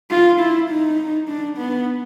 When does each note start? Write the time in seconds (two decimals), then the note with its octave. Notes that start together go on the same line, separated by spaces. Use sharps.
0.11 F4
0.40 E4
0.70 D#4
1.28 D4
1.58 B3